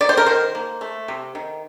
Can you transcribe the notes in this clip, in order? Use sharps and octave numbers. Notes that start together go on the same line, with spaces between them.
D#3 D5
C5
A#4
D#3 C5
A#3
A3
C3
D#3